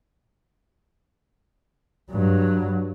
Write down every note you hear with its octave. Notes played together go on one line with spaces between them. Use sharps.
G2 F#3